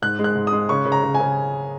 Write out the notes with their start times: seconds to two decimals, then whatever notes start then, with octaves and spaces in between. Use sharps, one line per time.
0.02 G#2 F#6
0.19 G#3
0.24 F#6
0.35 G#2
0.47 D#6
0.53 G#3
0.69 C#3 C#6
0.85 C#3
0.92 A#5
1.03 C#3
1.15 G#5
1.20 C#3